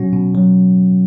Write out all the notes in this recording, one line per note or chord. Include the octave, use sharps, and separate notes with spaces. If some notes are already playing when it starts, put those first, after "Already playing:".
Already playing: B2 F#3 C#4 F#4
B2
F#3